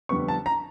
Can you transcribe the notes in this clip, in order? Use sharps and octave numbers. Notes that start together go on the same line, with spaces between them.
F2 D3 G3 B3 C#6
A5
A#5